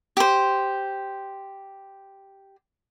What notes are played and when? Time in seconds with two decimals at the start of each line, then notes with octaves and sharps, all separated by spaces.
0.17 G4 C5